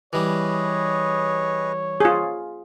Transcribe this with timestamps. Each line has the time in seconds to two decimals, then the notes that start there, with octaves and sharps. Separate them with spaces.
0.13 E3 G3 G#4 B4 C#5 D#5
2.00 F4 G#4